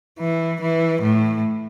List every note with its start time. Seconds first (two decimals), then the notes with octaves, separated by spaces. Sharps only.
0.20 E3
0.61 E3
1.03 A2